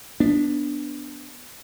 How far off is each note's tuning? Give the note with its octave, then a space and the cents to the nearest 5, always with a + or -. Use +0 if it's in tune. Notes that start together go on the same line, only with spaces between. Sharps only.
B3 +0 D4 -5